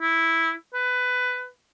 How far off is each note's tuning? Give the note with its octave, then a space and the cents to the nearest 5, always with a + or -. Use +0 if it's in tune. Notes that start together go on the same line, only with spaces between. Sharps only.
E4 -5
B4 +15